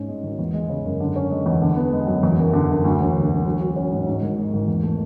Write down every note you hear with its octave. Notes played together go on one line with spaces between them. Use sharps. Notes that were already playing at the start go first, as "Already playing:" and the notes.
Already playing: G#2 C#4
G#3
G#1
E2
G#3
C#3
F#1
D3
C#4
G#3
E2
D3
B3
G#3
F#2
E2
F#1
D3
F#1
D2
E1
D3
E1
F#3
F#4
C#4
G#2
G#2
G#1
G#3
G#1
E2
A3